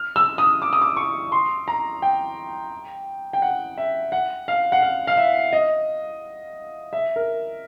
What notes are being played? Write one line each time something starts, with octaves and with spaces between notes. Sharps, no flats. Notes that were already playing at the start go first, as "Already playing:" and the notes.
Already playing: F6
E6
D#6
D6
D#6
D6
C#6
C6
A#5
G5
G5
F#5
E5
F#5
F5
F#5
F5
F5
E5
D#5
E5
A#4